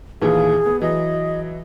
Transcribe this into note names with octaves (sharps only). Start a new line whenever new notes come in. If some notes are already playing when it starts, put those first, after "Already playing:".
D#2 A#2 E3 G#4
B3
E3 F#3 D#5